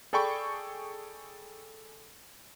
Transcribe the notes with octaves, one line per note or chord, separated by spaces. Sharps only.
G#4 A4 D5 G5 B5 C#6